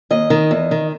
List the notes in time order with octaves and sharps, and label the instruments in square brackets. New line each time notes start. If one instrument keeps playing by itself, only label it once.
[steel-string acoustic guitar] D#2 D#5
D#3
E2
D#3